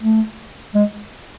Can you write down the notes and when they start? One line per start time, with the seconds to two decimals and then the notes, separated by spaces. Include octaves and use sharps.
0.02 A3
0.75 G#3